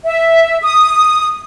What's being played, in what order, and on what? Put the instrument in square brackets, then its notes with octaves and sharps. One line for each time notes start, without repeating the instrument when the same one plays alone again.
[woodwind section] E5
D#6